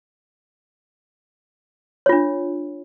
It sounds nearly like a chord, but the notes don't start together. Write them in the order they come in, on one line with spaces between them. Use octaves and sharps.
C#5 F4 D4